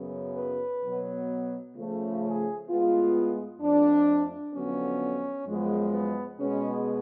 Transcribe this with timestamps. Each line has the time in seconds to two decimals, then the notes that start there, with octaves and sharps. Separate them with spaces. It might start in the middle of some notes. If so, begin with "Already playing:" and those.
Already playing: F#2 C#3 F#3 B3
0.36 B4
0.83 B2 F#3 B3
1.75 C#3 F3 A3
2.22 G#4
2.68 A2 G#3 B3 F4
3.61 F2 F3 A3 D4
4.54 F2 D3 F#3 B3 C#4
5.46 F#2 F3 G#3 B3
5.92 B3
6.39 B2 G#3 B3 C#4